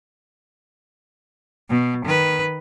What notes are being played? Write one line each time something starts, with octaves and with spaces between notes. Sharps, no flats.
B2
D#3 B4